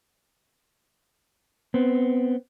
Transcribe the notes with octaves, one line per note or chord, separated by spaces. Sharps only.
B3 C4